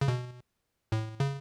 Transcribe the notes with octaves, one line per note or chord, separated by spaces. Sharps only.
C#3
B2
A2
C#3